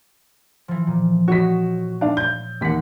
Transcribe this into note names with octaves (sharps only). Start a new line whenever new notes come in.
E3 F3
A#2
F#4 C#5 D#5 B6
D4 F5
G6
D#2 E3 F#5 B6